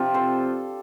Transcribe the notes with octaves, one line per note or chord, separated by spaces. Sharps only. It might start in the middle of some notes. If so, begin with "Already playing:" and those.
Already playing: C3 F3 C4 D4 F4 G4
A4 C5